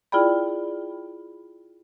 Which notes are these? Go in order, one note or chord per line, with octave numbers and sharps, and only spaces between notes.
E4 F4 G#4 D5 G5 B5